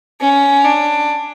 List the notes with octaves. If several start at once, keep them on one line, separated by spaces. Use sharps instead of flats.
C#4
D4